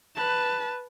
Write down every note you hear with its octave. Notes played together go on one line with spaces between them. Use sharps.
B4 A5